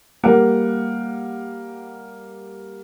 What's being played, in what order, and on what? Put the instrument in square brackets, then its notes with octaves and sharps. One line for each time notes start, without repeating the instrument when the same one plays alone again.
[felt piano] G3 A#3 F#5